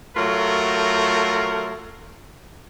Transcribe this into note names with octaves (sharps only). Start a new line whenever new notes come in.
F#3 A3 F4 A#4